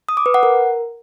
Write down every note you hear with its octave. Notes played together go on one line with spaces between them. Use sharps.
D#6
D6
B4
F#5
A#4